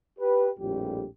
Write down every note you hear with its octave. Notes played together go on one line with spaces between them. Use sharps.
G4 B4
A#1 F2 A2 G3 G4